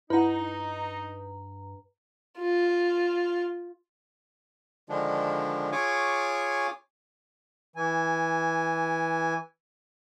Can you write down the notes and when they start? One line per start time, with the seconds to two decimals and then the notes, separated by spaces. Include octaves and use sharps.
0.10 G2 D#4 E4 B4 F#5 A#5
2.38 F4
4.89 D3 D#3 F3 G#3 D4
5.72 F4 G#4 C#5 G#5 C#6 D6
7.76 E3 G#5